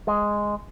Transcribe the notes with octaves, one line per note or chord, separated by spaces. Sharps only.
G#3